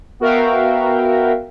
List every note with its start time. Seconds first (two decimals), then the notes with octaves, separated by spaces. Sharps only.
0.20 B3 F#4 A#4 E5 F5 G5